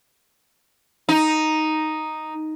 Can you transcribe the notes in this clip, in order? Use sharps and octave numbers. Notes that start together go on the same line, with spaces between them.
D#4